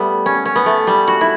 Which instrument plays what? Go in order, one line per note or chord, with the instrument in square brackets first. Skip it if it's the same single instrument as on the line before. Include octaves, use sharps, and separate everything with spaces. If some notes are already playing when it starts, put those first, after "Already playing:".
Already playing: [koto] G3 A3 B3
C#4
C#4
B3
A3
G3
F#4
E4